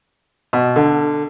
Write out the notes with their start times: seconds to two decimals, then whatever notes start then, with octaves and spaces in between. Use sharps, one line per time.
0.53 B2
0.76 D3